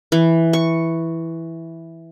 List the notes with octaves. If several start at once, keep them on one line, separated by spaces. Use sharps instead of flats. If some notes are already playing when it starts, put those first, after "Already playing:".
E3
C#6